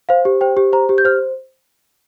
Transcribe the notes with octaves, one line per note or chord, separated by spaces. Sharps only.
C5 F5
G4
C5 G5
G4
C5 A#5
G4
G6
C5 F6